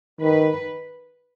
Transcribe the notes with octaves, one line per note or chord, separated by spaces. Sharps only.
D#3 B4